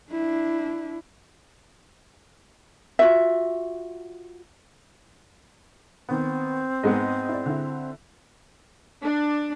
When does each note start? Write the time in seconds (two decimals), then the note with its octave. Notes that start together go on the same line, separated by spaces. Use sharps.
0.12 D4 E4
2.99 F4 F#4 E5
6.09 D#3 B3 C4
6.83 G#2 G#3 B3 D#5
7.29 E4 D5
7.46 D3 E4
9.04 D4